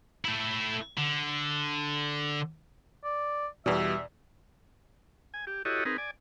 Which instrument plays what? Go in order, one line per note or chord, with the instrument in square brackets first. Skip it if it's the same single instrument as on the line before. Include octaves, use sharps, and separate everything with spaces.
[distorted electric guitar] A3 E4
D3
[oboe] D5
[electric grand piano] E2 B2 [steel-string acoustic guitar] G3 [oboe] E5
[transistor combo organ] G#5
G4
E4 F#4 G4 A4 C#5 D#5
C4 D#4 G#4 A#4 B4
D5 G#5